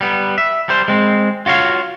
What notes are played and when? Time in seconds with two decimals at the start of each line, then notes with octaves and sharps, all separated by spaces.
0.01 G3 B3
0.38 E5
0.69 G3 C5
0.88 G#3 C4
1.46 F4 F#4 C#5 F5